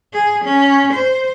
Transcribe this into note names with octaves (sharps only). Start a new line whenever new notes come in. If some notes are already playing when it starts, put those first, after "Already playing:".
G#4
C#4
C5